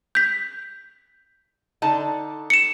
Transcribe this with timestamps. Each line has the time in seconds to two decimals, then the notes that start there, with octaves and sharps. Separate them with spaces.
0.15 G6 B6
1.82 D3 D#4 A5
2.50 C#7 E7